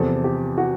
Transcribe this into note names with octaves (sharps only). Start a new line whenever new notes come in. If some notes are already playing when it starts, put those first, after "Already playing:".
Already playing: E2 C3 F3 A4
G4
F#4